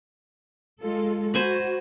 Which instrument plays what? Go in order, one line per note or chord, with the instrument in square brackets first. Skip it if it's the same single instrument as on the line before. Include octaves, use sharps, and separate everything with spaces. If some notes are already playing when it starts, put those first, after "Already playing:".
[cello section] G#3 F4 A4
[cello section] F#4 [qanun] C5 G#5 B5